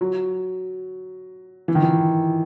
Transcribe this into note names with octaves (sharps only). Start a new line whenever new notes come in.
F#3
E3
D#3
E3